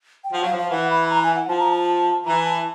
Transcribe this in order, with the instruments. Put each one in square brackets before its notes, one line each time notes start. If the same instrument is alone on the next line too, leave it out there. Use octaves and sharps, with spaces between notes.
[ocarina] G5
[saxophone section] F3 [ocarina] F#5
[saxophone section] F#3 [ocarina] F5
[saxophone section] F3
[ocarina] F5
[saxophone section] E3 [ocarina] F#5
[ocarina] B5
A#5
G#5
F#5
[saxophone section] F3 [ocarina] A5
[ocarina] A#5
A5
[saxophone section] E3 [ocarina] A#5
[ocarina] A5